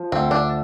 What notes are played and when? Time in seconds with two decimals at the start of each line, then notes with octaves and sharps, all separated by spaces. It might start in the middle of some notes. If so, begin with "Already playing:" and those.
Already playing: F3
0.12 D2 C4
0.31 D4